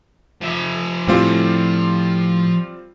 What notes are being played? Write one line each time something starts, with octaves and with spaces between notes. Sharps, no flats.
F3 E5
A2 G3 C4 F4